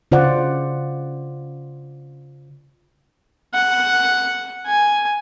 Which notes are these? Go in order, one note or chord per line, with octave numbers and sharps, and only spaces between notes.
C#3 F4 C5 D5 F#5
F#5
G#5